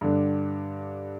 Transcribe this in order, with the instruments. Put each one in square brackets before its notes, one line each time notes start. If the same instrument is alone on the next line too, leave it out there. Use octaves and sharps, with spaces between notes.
[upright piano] G2 D3 G3 D4